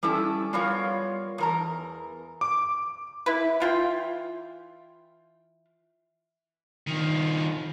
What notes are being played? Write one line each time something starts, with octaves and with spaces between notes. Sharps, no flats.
G3 C#4 E4 A4
G3 B3 F4 A#4 C#5
E2 A#4 A#5
D6
E4 B4
E3 F4 G5
D#3 F3